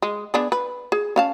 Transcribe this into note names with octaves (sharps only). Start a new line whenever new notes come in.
G#3
B3 D4 G#4
B4
G#4
C#4 F5 A5